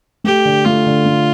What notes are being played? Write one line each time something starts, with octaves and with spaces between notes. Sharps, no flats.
A3 G4
D3
A3 F4
D3
A3